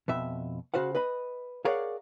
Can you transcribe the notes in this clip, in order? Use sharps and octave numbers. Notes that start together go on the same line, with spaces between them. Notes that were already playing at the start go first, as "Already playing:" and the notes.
F2 B2 E5
C#3 F#4 C5 F5 F#5
B4 D#5 B5
G#4 A#4 C#5 D5 F5 F#5